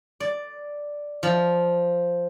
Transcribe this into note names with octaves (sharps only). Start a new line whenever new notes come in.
D5
F3